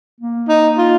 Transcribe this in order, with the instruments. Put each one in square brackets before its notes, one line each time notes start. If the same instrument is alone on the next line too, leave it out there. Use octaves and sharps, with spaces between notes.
[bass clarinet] A#3
[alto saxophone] D#4
F4